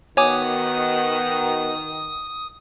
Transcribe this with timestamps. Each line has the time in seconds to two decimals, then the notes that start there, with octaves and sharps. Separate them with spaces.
0.17 D#3 B3 F#4 C#5 G#5 D6 D#6